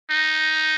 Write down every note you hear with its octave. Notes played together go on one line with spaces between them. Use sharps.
D#4